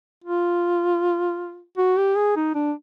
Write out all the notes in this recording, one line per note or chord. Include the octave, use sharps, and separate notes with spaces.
F4
F#4
G4
G#4
D#4
D4